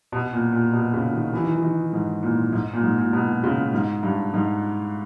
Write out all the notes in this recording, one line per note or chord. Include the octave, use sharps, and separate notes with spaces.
B2
A#2
A#2
B2
C#3
D#3
E3
D#3
E3
D#3
G#2
A#2
G#2
A#2
G#2
A#2
B2
C#3
G#2
G2
G#2